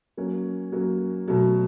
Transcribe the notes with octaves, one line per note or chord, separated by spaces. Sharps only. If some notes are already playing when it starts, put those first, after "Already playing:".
F#3 A#3 C#4
F#3 A#3 C#4
B2 F#3 A3